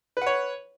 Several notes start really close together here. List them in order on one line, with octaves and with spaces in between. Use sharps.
B4 F#5 C#5